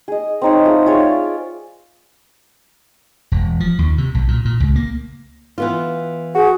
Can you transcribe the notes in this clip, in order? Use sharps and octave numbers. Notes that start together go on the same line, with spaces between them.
G#4 D#5
C4 D#4 C#5
A3 F4 G#4
F4 G#4 C#5 E5
D5
E1
F3
D#2
C3
B1
A#2
A#2
C#2
A#3
E3 B3 F4
F#4 G#4